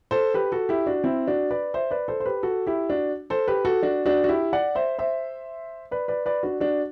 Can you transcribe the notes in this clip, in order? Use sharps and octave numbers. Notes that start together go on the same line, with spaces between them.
A4 C5
G4 B4
F#4 A4
E4 G4
D4 F#4
C4 E4
D4 F#4
B4 D5
C5 E5
B4 D5
A4 C5
C5
G4 B4
F#4 A4
E4 G4
D4 F#4
A4 C5
G4 B4
F#4 A4
D4 F#4
D4 F#4
F#4
E4 G4
D5 F#5
C5 E5
C5 E5
B4 D5
B4 D5
B4 D5
D4 F#4
D4 F#4